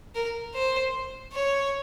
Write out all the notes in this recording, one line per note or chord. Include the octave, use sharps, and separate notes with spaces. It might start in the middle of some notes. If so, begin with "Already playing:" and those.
A#4
C5
C#5